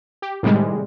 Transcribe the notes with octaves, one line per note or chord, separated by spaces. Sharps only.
G4
A2 C3 D#3 G3 G#3